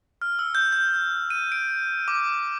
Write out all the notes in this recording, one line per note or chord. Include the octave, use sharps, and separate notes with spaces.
F6
E6
G6
G6
D#7
D7
D6